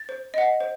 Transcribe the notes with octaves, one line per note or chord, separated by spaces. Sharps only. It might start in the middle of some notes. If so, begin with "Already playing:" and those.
Already playing: A6
C5
D#5 F#5
C5